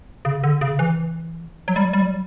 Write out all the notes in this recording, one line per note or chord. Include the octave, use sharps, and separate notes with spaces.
C#3
D3
C#3
E3
F#3
G3
F#3
G3
F#3